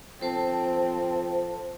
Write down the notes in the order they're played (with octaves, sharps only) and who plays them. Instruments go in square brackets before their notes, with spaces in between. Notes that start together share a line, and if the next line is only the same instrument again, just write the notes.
[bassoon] F3 [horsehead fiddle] C4 [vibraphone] A4 C5 A5